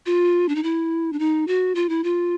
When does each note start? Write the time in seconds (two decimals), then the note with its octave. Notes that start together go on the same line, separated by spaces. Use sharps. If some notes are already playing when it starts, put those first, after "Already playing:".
0.06 F4
0.49 D4
0.55 D#4
0.63 E4
1.13 D4
1.19 D#4
1.47 F#4
1.75 F4
1.89 E4
2.04 F4